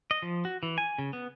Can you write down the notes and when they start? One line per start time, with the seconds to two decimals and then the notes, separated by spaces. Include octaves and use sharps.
0.11 D#5
0.22 F3
0.45 F#4
0.63 E3
0.78 G#5
0.98 C#3
1.13 B3